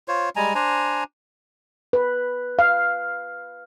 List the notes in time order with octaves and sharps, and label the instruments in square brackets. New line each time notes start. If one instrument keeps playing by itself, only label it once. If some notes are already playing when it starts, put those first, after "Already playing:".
[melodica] F4 C5 C#5
G3 G#3 G#5 A#5
D4 C5 G#5 A#5
[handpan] B4
F5